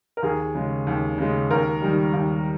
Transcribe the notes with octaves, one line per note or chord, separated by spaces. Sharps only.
A#4
D#2 G#4
C#3 G#3
D#2
C#3 G#3
D#2 A#4
D#3 G3
D#2